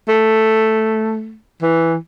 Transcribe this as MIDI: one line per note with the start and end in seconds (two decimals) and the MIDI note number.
0.08 1.36 57
1.62 1.96 52